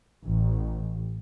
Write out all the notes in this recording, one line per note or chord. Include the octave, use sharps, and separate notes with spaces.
A1